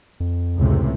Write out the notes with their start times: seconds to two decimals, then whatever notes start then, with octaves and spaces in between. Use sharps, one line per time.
0.20 F2
0.57 C#2 A2 C3